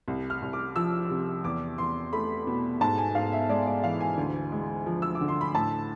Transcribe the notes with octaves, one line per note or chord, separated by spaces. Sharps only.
C2
F6
C2
D6
F3 E6
C3
E2 D6
E2 C6
A3 B5
B2
G#2 A5
G#5
G#2 F5
E5
G#3 D5
D5
E3 F5
G#5
D2
G#3
F3
E6
D6
D3
C6
B5
A2 A5